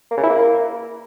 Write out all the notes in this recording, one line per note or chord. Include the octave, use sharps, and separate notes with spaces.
A#3
C#3
E4
A#3